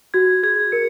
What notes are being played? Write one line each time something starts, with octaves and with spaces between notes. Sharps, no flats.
F#4 G#6
G#4 G#6
A#4 C#7